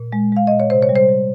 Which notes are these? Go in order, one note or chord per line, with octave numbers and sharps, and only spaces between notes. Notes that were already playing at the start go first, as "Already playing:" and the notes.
Already playing: A#2
G#3
G#3 F5
A#2 D#5
C#5
C3 C5
C#5
G3
C5
G3